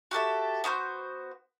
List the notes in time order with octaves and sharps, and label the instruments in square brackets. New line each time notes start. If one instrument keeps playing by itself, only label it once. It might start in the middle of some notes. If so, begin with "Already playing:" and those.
[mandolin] F#4 G4 A4 E5
B3 F#4 C5 G6